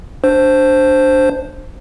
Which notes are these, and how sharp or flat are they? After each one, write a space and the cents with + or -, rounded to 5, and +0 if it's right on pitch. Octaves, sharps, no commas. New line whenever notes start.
D4 +0 C5 +0